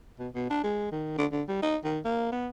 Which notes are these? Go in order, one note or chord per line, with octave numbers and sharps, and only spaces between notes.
B2
B2
D4
G#3
D#3
D3
D3
G3
D#4
D#3
A#3
B3